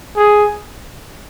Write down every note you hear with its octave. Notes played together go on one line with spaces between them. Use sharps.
G#4